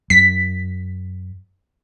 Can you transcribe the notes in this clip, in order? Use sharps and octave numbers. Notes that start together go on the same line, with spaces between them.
F#2 B6